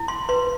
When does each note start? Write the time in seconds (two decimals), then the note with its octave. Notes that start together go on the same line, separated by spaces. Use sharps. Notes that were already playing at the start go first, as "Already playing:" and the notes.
Already playing: E4
0.08 C6
0.29 B4 C6